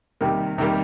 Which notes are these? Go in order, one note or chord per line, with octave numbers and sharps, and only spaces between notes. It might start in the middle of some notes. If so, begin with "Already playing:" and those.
C3 D#3 G3 A#3
C3 D#3 G3 A#3